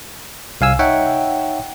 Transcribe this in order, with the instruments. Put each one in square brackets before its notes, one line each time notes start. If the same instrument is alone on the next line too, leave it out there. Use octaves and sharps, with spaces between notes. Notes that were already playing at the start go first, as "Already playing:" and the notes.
[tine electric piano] C2 F5 G#5 E6
D#4 C#5 E5 F#5 G5